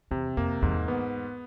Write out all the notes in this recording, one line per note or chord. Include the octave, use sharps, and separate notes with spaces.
E2 C3
F2 A#3
E2 G#2
B3